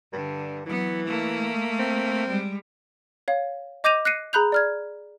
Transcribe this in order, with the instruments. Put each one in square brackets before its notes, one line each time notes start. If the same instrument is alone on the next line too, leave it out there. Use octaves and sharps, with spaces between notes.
[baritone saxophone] G2 [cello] D3
[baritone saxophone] E3 [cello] F#3 B3
[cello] A3 A#3
[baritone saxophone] C4
[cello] G3 G#3
[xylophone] C#5 F5
D#5 D6 G6 A#6 D#7 F7
F#6 A#6 C7 C#7 D#7
G#4 A#5 B5 F#6 G6 F7
D5 F6 G#6